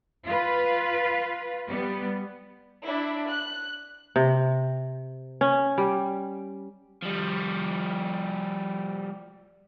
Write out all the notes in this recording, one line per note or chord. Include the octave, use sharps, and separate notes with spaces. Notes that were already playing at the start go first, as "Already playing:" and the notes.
F4 B4
G3 B3
D4 E4
F#6
C3
C#4
G3
F3 G3